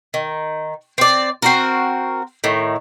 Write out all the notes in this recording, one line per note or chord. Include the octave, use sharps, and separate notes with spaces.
D#3
C4 D5
C4 F#4 A#4
A2 D#3